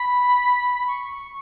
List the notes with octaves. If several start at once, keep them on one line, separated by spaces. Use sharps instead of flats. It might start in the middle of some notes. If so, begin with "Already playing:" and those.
Already playing: B5
C#6
C#6